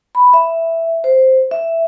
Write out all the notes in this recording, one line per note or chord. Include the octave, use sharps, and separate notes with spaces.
B5
E5
C5
E5